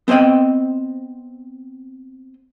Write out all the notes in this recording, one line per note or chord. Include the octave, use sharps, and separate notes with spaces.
B3 C4 C5 D#5 G5